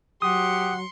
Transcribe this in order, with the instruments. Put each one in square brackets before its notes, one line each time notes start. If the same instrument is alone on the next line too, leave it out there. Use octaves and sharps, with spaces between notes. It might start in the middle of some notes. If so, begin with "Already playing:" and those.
[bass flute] F#3 [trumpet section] G4 F#5 [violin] C6 C#7 [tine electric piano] D#6